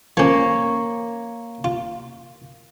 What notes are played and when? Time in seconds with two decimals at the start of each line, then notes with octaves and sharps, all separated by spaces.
0.17 F3 A#3 C#4 C#5
1.64 F4